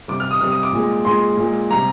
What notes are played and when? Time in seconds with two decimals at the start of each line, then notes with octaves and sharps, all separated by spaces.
0.08 C3 G3 D6
0.20 F6
0.31 D#6
0.41 C3 G3 F6
0.52 D#6
0.63 D6
0.73 A#2 G#3
1.05 A#2 G#3 C6
1.37 A#2 G#3
1.70 C3 G3 A#5